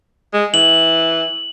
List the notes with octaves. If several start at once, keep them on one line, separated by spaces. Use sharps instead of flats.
G#3
E3 F#7